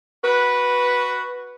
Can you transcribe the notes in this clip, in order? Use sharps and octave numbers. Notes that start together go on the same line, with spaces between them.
F#4 B4